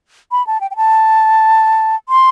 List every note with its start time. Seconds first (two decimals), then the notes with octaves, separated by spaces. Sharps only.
0.31 B5
0.47 A5
0.61 G5
0.71 G5
0.76 A5
2.09 C6